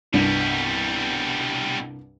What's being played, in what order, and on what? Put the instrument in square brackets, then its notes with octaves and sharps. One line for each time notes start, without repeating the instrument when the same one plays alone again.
[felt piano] C2 G2 D4 [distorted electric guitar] B2 G3